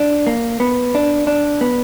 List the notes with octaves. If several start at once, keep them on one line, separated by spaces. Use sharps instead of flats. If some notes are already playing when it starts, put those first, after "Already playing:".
Already playing: D4
A#3
B3
D4
D4
B3